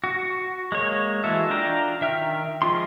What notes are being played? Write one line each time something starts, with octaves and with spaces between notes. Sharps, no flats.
F#4
G#3 A#3 C#5
E3 G#3 F#4 A4 E5
D4 F4 G5 A#5
D#3 E5 G5 F6
F3 G#3 F4 G5 C6